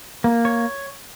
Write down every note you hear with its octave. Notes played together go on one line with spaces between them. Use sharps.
A#3
C#5